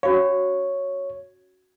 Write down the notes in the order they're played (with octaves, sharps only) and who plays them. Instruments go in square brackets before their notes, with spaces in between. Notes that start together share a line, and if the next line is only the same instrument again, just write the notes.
[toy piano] C#4 F#4 F5 [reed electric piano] C#5